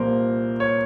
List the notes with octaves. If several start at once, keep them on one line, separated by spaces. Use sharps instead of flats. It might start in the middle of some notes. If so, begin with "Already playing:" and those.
Already playing: C2 A#2 F3 A#3 A#4 C5
C#5